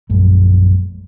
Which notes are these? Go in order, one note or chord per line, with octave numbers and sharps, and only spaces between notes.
A#1 F#2 G#3